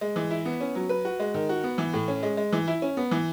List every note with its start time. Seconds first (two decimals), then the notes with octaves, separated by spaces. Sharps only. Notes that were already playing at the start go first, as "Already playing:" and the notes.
0.01 G#3
0.16 E3
0.31 E4
0.45 B3
0.61 C#4
0.75 F#3
0.89 B4
1.05 F#4
1.20 G#3
1.34 D#3
1.49 F#4
1.64 B3
1.78 E3
1.93 A2
2.08 C#4
2.23 G#3
2.37 G#3
2.53 E3
2.68 E4
2.82 C#4
2.97 B3
3.11 E3